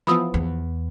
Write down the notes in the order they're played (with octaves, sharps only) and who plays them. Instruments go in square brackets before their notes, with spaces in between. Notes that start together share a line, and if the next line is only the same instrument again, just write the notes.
[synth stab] E3 F3 B3 [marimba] B5 D#6 E6
[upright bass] E2